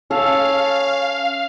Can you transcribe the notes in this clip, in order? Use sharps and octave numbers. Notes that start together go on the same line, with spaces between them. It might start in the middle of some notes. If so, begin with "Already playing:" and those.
C#4 A4 F5